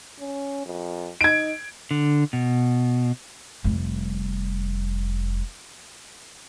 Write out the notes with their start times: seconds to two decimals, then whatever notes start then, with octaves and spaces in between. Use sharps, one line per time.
0.19 C#4
0.66 F2
1.21 D#4 G#6 D7
1.91 D3
2.33 B2
3.64 F1 G3